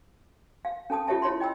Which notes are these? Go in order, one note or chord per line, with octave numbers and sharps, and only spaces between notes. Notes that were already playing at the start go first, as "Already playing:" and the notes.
F5
C#4 A4 A5 D#6
F4 G4 C#5 E5 A5
E4 C#5 B5 C6
D#5 G5 B5 E6